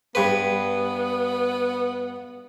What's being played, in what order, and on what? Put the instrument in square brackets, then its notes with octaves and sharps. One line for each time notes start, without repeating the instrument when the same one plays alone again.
[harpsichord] G2 B4 [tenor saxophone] B3